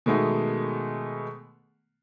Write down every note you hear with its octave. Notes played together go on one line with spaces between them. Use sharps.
B2 D#3 G#3 A3 B3